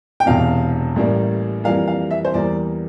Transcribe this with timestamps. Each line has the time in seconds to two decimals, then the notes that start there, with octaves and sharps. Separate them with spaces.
0.20 G5
0.26 E1 E2 C3 F5
0.96 A1 A2 G3 A#3
1.64 F2 E3 G3 A#3 F5
1.88 F5
2.11 E5
2.25 C5
2.34 E2 E3 G3 A#3 D5